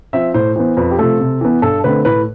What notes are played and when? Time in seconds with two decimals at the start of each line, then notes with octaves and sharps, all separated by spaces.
0.13 F3 C4 E5
0.34 A2 C5
0.56 E3 B3 C5
0.77 F2 B4
0.91 G4
0.99 C3 F3 A3 A4
1.20 C3
1.41 E3 B3
1.62 G2 A4
1.84 D3 A3 C4 B4
2.05 A2 B4